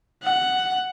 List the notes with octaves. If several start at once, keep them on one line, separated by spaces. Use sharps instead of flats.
F#5